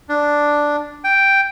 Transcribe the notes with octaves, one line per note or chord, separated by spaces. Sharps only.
D4
G5